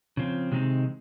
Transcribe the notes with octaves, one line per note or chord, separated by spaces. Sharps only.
C#3 F3 C4
C3 D#3 G#3 C4 D#4